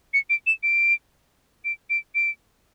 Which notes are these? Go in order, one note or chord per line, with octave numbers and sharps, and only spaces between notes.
C#7
D7
E7
D7
D7
D7
D7